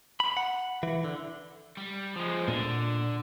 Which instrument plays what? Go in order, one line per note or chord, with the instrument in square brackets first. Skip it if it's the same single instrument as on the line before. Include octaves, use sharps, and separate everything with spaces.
[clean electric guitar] B5
F#5
E3
D3
[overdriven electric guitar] G3
F3 G#3
[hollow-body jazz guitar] A#2 [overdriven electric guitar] D3